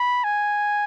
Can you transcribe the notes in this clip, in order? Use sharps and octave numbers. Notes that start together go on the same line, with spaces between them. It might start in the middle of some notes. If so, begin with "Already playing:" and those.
Already playing: B5
G#5